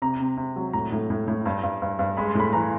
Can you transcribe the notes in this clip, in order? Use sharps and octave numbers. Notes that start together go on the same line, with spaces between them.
C3 A#5
C3
C3
F#3
A2 A#5
A2
A2
A2
G2
G2
G2
G2
G#3 B5
C6
A2 B5
E3 A#5